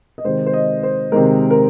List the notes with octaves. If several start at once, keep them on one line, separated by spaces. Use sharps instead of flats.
D#5
C3 D#3 G#3 C5
C5
D#5
C5
C3 D#3 G#3 A#4
A#4